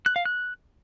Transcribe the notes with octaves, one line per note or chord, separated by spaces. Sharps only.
F#6
F5
F#6